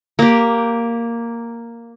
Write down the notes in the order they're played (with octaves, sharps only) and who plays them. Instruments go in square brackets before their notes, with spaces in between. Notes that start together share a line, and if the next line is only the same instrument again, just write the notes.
[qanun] A#3 G4